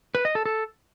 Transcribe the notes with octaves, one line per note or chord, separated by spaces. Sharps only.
B4
D#5
A4
A4